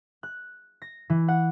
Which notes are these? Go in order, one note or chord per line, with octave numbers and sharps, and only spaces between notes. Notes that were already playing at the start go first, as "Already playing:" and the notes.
F#6
A#6
E3
F#5